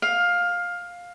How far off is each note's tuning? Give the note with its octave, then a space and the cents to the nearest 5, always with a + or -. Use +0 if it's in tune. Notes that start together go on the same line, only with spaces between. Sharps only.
F5 +15